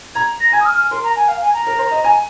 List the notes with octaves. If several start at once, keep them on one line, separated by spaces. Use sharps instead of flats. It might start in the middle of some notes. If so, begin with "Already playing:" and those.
A#5 G#6
A#6
G#5 G#6
D#6
F6
F6
A#4 C6
A#5
G#5
F5
G#5
A#5
A#4
C5
D#5
G#5